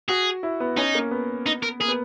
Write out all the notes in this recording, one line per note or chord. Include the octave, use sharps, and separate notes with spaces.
F#4 G#4
E4
B3
C#4 D#4
A#3
B3
D#4
A#4
A#3 G#4
B3